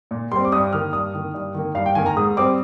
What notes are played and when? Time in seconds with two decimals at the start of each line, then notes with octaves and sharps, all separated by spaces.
0.11 A#2
0.32 G3 C4 C6
0.45 D6
0.52 G2 D#6
0.73 D#3 A#3 F6
0.93 G2 D#6
1.14 D#3 A#3
1.34 G2
1.54 D#3 A#3
1.75 G2 F5
1.86 G5
1.95 D#3 A#3 G#5
2.06 A#5
2.16 G#2 D#6
2.37 G3 C4 D6